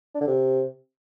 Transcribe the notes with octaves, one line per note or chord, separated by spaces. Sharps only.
D4
D3
C3